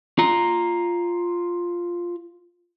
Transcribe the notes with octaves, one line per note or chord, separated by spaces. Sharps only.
F4 A#5